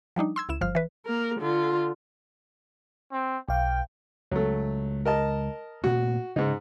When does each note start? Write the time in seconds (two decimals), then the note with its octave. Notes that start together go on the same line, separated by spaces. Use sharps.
0.16 F3 G3 D4 D#4
0.36 C6 E6 G#6
0.49 C#2 E4 E7
0.61 G1 F3 C5 F6
0.75 E3 B4
1.06 A#3 A#4
1.40 D3 F4
3.12 C4
3.49 B1 F5 G5
4.31 C#2 F#3 A3
5.05 A#4 D#5 A5
5.84 A#2 A3 C4 F#4
6.36 G#2 C#3 D#4